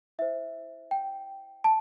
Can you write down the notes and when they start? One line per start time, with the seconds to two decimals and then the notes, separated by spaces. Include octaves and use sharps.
0.19 E4 C5 E5
0.91 G5
1.64 A5